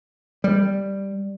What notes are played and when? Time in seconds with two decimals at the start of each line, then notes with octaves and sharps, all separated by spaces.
0.44 G3